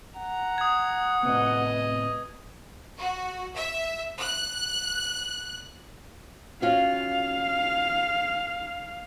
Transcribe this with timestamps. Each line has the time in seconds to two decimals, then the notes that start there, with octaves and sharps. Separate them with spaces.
0.17 F#5 A#5
0.58 D#6 G#6
1.23 A2 C3 B3 B4 D#5
2.97 F#4
3.56 E5
4.21 F#6
6.62 C#4 F4 F#4 F5